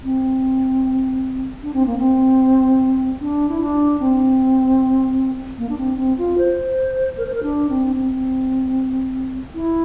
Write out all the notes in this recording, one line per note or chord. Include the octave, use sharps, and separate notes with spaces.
C4
D4
C4
A#3
C4
D4
E4
D4
C4
A#3
D4
C4
C4
F4
C5
A#4
C5
A#4
D4
C4
C4
E4